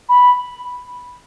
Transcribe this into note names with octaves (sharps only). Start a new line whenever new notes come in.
B5